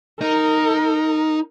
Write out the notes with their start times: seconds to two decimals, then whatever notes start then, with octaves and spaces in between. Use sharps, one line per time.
0.21 D#4 A#4